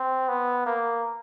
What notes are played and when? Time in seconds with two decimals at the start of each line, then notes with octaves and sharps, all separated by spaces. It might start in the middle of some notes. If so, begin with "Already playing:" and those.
Already playing: C4
0.29 B3
0.66 A#3